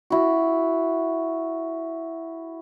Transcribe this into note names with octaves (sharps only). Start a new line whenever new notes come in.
E4 F#4